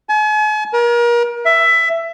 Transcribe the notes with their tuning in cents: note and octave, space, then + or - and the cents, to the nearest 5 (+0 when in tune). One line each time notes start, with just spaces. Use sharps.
G#5 +45
A#4 +35
E5 +15